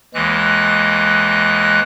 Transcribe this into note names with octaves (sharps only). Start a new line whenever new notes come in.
D#2 E3 G#3 F#6